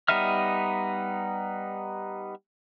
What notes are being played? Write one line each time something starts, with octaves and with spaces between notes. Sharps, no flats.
G3 B3 D#4 E5 F6